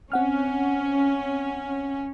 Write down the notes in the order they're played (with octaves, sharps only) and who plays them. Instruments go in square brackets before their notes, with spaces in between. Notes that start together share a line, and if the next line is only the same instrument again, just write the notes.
[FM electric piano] C4 F#5 F6 [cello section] C#4